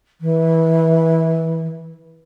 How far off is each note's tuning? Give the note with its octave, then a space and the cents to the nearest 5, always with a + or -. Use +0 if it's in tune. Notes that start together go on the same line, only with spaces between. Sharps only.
E3 -20